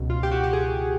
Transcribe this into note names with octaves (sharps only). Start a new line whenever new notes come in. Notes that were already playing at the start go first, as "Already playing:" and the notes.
Already playing: C#2 B2
F4
G4
F#4
G4
G#4